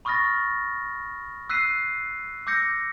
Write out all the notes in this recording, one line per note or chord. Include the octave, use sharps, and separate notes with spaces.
B5 C#6 D#6 F6 A6 A#6
E6 F#6 B6 C7 D#7
D6 E6 G6 A#6 C#7